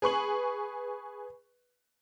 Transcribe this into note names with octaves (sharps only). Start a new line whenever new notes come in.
G#4 B4 C#6 F#7